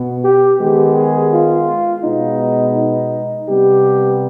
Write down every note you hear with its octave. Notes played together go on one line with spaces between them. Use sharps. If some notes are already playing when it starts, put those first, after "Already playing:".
Already playing: B2 B3
G4
D#3 G#3 B3 G4
G#4
F4
B2 G#3 B3 D#4
D#4
C3 G3 B3 G4